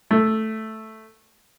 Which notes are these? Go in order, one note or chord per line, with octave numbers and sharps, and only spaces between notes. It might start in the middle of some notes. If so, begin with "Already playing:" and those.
A3